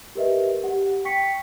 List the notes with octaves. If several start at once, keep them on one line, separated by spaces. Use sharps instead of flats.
G4 A#4 B4 D#5 E5
G4 F#5
G5 C#6 B6 C#7